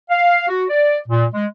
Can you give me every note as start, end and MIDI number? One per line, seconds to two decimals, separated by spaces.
0.10 0.46 77
0.49 0.64 66
0.69 0.97 74
1.08 1.26 46
1.34 1.45 56